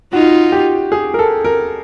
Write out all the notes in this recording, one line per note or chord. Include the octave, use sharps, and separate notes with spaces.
D#4 F4 F#4
G4
G#4
A#4
A4
A#4